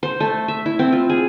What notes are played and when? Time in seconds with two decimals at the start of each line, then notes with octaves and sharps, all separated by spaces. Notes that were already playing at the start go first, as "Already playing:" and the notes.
0.03 C5
0.20 A3
0.48 E5
0.66 E4
0.79 C4
0.92 F4
1.10 G#4